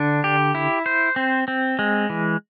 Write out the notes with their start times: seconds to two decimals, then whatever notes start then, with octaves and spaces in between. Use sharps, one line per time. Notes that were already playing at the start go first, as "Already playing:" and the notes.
Already playing: D3 D4
0.24 G4
0.55 E4
0.86 C5
1.16 C4
1.48 C4
1.79 G#3
2.10 E3